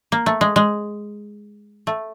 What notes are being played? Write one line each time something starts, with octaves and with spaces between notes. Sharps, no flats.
A#3
A3
G#3
G#3
A3